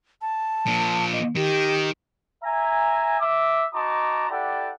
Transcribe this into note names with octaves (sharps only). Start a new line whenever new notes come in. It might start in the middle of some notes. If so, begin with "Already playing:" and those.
A5
A#2 F3
D#5
D#3 G4
E5 G#5 A#5
E5 D6
D#4 F#4 A5 A#5 C6 D6
E4 G4 A4 D5 F#5